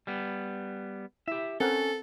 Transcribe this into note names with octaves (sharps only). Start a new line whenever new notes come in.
G3 B3
E4 G4 E5
C4 C#4 A4 A#4 F#5